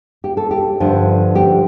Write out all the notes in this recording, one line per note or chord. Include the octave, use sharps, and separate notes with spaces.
G4
A4
G4
G2 D3 F3
G4